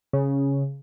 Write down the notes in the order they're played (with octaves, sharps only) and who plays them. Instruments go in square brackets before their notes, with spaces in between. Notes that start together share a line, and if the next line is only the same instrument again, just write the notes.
[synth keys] C#3